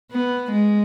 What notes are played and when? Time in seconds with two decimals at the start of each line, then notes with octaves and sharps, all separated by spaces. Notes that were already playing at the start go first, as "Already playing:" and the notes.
0.11 B3
0.52 G#3